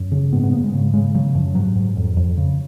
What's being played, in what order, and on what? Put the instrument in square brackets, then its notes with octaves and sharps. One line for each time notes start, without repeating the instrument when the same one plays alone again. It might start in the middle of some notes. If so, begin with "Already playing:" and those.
Already playing: [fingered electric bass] F#2
C#3
G#2 B3
B3
G#2 A#3
G#3
C#3
C#3 G#3
C#3 F#3
F#2 F3
G#2 F#3
G#2
F2
F2
C#3